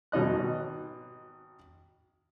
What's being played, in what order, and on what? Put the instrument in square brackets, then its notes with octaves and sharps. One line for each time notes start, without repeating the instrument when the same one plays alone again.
[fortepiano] G#1 B2 D#4 D#5 F#6